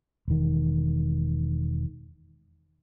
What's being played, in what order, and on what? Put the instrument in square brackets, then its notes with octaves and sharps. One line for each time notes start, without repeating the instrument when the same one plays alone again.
[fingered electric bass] E1 D#3